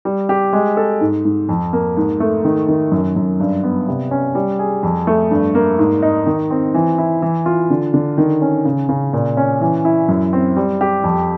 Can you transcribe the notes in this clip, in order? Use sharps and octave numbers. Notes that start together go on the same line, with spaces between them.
G3
G4
G#3
A4
G#2
G#2
F2
A#3
G#2
A3
D#3
D#3
F#2
F#2
G2
B3
C3
C#4
G3
G#4
F2
A3
G2
A#3
G#2
D#4
D#3
C4
E3
E4
E3
F4
D3
D3
D#3
C#4
C#3
C#3
A#2
C#4
E3
E4
F#2
C4
G3
G4
F2